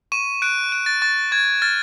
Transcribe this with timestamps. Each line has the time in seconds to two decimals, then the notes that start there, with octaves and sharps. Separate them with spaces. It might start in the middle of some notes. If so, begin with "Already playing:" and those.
0.12 C#6 D#7
0.42 F#6 D7
0.72 F#6 D7
0.86 A6
1.02 C#6 A6
1.32 C#6 G#6
1.62 F6 A6